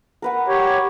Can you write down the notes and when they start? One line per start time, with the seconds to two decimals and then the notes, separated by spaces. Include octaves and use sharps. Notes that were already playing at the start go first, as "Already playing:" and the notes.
0.22 A#4 B4 F#5
0.48 G4 C#5